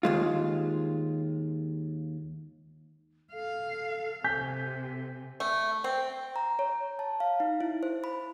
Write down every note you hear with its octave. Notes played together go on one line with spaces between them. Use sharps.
D#2 G#3 F4
A4 F5
C3 G#5 G6 B6
A3
C4
A#5
C#5
A5
F5
D#4
E4
C5
B5